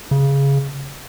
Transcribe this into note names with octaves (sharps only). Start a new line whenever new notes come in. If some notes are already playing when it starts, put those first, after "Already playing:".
C#3